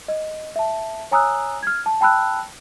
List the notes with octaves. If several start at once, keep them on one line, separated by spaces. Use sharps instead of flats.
D#5
E5 A5
C#5 G#5 A#5 D#6 E6 F#6
F6 G#6
A5
G5 A5 B5 E6 F#6